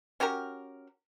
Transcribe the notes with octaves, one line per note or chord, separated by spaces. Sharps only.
C#4 F#4 G4 A#4